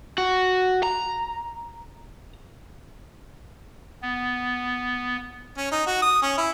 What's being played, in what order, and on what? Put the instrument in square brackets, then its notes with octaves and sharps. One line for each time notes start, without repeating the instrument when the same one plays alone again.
[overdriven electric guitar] F#4
A#5
[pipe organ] B3
[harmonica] C#4
D#4
F#4
D#6
C#4
E4